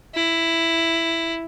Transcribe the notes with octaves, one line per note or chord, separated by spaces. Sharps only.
E4